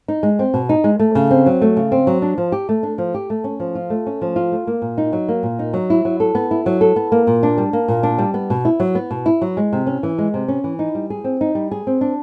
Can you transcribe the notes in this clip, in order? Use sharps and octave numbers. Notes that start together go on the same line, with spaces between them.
D#4
G#3
C4
B2
D#4
G#3
A3
C#3
C4
F#3
A3
C#3
C4
F#3
D4
F3
G4
A3
D4
F3
G4
A3
C#4
F3
F4
A3
C#4
F3
F4
A3
A#3
A#2
D#4
F#3
A#3
A#2
D#4
F#3
E4
F#3
A4
B3
E4
F#3
A4
B3
A#3
A#2
D4
G3
A#3
A#2
D4
G3
B3
B2
E4
F#3
B3
B2
E4
F#3
G#3
C3
C#4
E3
G#3
C3
C#4
E3
D#4
G3
G#4
C4
D#4
G3
G#4
C4
D4